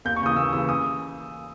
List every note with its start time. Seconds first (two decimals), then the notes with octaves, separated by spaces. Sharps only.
0.05 D#2 G6
0.16 C#6
0.22 C#3 E3 D#6
0.37 D#2 E6
0.53 C#3 E3 E6
0.69 D#6